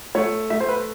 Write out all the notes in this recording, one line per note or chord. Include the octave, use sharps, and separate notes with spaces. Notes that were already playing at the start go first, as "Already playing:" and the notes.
A3 C#5
A3 E5
C5
B4